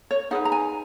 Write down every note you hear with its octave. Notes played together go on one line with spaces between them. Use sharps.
C#5
D#4 G#4 B4 F#5
A#5
G#5